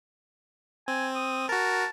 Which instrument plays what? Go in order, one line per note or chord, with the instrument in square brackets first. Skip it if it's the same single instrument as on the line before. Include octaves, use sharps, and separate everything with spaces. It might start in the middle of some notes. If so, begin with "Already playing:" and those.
[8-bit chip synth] C4 [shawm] G#5
[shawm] D#6
[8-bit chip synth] F#4 A#4 [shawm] A5